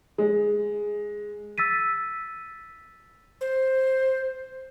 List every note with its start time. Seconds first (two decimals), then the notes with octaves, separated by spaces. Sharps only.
0.18 G#3
1.58 E6 A6 B6 D#7
3.41 C5